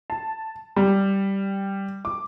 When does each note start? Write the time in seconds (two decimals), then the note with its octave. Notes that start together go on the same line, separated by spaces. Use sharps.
0.10 A5
0.76 G3
2.05 D6